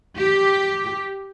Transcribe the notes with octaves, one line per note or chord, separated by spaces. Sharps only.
G4